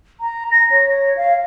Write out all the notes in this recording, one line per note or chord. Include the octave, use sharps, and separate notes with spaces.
A#5
A#6
C#5
F5